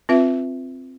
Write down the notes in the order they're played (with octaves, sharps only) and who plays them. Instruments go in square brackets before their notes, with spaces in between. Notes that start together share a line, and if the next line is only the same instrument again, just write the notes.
[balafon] C4 F4 B4 E5